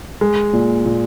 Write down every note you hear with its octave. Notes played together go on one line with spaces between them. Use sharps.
G#3
A#2
A#2